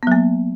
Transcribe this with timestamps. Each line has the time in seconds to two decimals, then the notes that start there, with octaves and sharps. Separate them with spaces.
0.03 B3
0.07 F#3
0.12 A#3